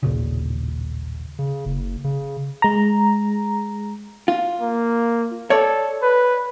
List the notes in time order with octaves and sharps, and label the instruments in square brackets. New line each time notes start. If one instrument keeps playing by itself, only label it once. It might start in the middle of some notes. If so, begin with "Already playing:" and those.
[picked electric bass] A1 D#2 A#2 C#3
[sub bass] C#3
F#1
C#3
[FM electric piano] G#3 A#5
[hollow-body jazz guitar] F4
[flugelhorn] A#3
[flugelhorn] A4 [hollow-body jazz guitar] C#5 D5
[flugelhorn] B4